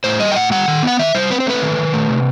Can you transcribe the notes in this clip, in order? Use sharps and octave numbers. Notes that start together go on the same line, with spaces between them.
A2 C5
G3 D#5
G5
A2 F#5
G3 F#5
D#3
B3 F#5
D#3 E5
G3 C5
C4 B4
C5
A3 B4
D#3
D#3
A3
C3